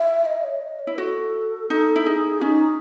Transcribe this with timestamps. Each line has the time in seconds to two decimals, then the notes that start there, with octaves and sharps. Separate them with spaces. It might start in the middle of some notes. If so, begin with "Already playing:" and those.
Already playing: E5
0.25 D#5
0.44 C#5
0.62 D#5
0.79 C#5
0.87 E4
0.98 F#4 A4
1.69 D#4 A4
1.96 E4
2.06 D#4 G#4
2.41 C#4 D#4